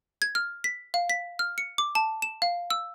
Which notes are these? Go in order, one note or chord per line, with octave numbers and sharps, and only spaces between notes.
G#6
F6
B6
F5
B6
F6
C#7
D6
A5
E7
F5
E6